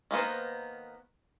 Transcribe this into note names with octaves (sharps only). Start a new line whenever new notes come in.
D#3 A#3 B3 C5